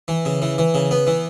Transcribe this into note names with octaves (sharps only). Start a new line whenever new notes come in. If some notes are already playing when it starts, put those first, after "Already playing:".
E3
C#3
E3
E3
C#3
B3
E3